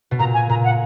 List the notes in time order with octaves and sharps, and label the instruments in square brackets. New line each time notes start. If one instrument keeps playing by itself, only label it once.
[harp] B2
[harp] A#2 [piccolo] A#5
[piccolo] G#5
[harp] A#2 [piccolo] A#5
[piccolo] F#5